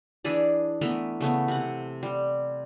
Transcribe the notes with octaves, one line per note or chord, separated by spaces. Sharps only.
E3 D4 G#4 D5
E3 A3 B3 A#4
C#3 A3 B3
C3 F#5
G3